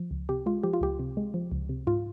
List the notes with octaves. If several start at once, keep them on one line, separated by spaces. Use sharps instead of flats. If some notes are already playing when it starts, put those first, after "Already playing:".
Already playing: F3
C#2
C3 G4
G#3 F4
F3 G4
F4
C#2 G4
C3
G#3
F3
C#2
C3
G#2 F4